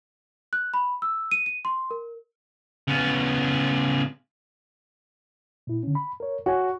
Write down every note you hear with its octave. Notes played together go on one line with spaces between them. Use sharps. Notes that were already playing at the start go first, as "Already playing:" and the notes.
F#6
B5
E6
D#7
D#7
C6
A#4
C#3 B3
A#2 E4
D3 C#4
B5
A#4 C#5
F#4 C#5 G#5